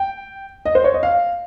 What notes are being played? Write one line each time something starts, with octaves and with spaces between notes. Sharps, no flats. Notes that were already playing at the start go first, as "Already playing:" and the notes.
Already playing: G5
D#5
C5
C#5
D#5
F5